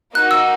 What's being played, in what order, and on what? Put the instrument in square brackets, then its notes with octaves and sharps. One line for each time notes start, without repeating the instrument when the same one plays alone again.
[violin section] A#3 D#4 F#4 [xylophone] F#6
[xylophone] E6